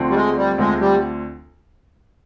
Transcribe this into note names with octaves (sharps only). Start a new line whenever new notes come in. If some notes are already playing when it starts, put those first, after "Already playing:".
Already playing: D2 D3 F3 C4
G3
G#3
G3
D2 D3 F3 G#3 C4
G3